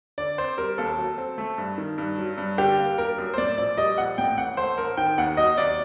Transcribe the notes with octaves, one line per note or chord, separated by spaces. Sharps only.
D3 D5
C4 C5
G3 A#4
D#2 A4
F#3
C4
A3
G2
D#3
G2
F#3
G2
D3 G4
A#3
G3 A#4
F#2
C5
A2 D5
A#1 D5
G3 D#5
A#1 F#5
A2 G5
A1 F#5
A3 C5
A1 A#4
D#3 G5
D#2 F#5
F#3 D#5
D#2 D5